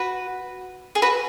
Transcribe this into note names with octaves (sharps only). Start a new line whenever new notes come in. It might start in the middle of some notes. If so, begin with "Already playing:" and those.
Already playing: F#4 B4
G#4
F#4 B4